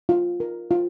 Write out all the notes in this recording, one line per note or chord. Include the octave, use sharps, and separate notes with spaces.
F4
A#4
F4